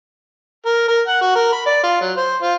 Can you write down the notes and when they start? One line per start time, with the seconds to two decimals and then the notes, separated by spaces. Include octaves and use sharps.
0.66 A#4
0.88 A#4
1.07 F#5
1.22 F#4
1.35 A#4
1.52 B5
1.66 D5
1.83 F4
2.01 F#3
2.17 C5
2.42 F4